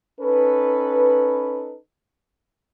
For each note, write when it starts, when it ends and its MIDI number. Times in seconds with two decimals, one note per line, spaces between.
0.21 1.78 61
0.21 1.78 63
0.21 1.78 69
0.21 1.78 71